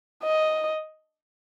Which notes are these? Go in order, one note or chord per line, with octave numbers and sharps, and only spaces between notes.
D#5